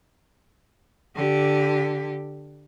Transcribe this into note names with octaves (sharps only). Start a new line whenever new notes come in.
D3 G4